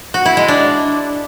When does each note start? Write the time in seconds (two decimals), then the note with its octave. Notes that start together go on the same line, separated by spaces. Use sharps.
0.14 F#4
0.26 E4
0.37 G#3
0.48 D4